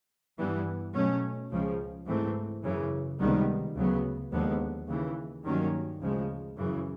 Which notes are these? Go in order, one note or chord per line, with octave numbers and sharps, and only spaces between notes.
G2 E3 G3 B3
B2 F#3 A3 C#4
C#2 C#3 F3
G#2 E3 A3 C4
F#2 C#3 E3
C#2 C3 D#3 G3 B3
D2 C#3 F#3 B3
D#2 D3 F3 G#3 B3
D#2 C#3 E3
G2 D#3 F#3 A#3 C#4
D2 C#3 F3 G#3
F#2 C#3 E3